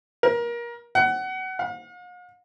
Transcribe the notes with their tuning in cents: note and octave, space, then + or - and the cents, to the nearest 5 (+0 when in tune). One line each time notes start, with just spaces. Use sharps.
A#4 +25
F#5 +25
F5 +45